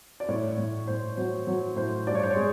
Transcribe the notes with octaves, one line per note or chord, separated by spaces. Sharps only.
D5
A2 C#5
A2
A2 C5
F#3 C5
F#3 C#5
A2 C5
G2 D5
C#5
C5
C#5
G#3